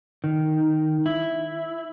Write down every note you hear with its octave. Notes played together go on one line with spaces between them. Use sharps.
D#3
E4